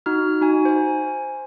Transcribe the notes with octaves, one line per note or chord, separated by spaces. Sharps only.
D#4 F#4 F6
D#4 F#4 G#5
C5 G#5